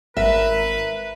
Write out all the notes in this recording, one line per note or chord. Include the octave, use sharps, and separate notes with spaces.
G#1 A#4 B4 E5